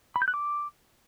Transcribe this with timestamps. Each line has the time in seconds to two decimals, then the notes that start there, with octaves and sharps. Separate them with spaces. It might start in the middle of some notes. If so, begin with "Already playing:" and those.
0.16 B5
0.22 G6
0.28 F#6
0.34 D6